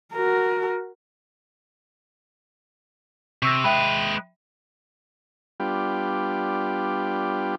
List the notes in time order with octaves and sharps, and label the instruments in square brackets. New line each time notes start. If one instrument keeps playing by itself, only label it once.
[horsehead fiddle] F#4 A#4
[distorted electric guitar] C3 [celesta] C#6 E6 A#6
[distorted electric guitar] G#3 B4 [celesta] E5 G5 B5
[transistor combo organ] G3 B3 D4 F4 G4